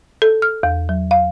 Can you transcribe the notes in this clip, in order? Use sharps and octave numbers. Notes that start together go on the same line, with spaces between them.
A4
F6
E2
F#3
F5